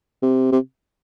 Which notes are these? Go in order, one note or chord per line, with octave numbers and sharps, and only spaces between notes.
C3
C3